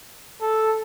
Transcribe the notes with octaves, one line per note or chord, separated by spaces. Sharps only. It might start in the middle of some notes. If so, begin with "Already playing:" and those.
A4